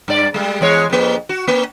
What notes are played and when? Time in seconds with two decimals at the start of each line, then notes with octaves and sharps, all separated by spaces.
0.08 G2 D5
0.34 G3 G#3
0.61 E2 G#3 C#5
0.90 F2 A#3
1.29 F#4
1.47 A#3